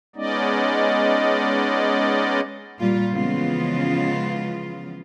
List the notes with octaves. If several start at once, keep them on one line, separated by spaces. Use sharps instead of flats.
G#3 B3 C#4 D#4 D5 D#5
A#2 G3 A#3 F4
C#3 E3 F3 G#3 B3 F4